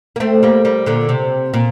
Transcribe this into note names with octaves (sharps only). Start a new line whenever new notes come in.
A#3
A3 C4
G3 A#3
G3 A#3
A#2 D3
C3
A#2